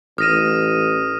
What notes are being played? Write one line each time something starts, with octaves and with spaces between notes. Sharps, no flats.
A1 D#6 F6 A#6 D#7 E7